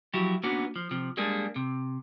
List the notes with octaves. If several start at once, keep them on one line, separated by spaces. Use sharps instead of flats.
F3 F#3 E4 F#4 G4
A#3 B3 C#4 D4 F#4
F3
C3 F3
G3 G#3 A#3 D4 G#4
C3